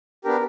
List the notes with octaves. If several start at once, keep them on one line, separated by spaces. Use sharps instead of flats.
B3 D4 G4 A#4